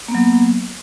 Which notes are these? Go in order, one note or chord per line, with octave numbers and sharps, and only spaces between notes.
F#3 A#3 B3